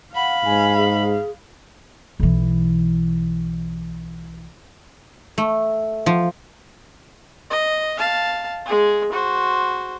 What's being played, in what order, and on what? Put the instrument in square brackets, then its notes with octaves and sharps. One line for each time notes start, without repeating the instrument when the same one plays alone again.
[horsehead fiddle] F5 [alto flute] F#5 [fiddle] B5
[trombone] G#2 [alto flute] G#5
[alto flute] G#4
[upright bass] B1 E3
[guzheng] A3
F3
[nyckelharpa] D#5
F5 A5
G#3 G#4
F#4 C5